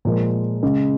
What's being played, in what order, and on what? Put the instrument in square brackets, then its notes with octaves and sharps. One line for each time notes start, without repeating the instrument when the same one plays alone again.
[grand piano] A#2 F3 G#3 A#4
C#3 G#3